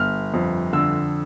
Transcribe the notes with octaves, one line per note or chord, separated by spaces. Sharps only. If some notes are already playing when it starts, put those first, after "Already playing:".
Already playing: G1 F6
F2
D3 E6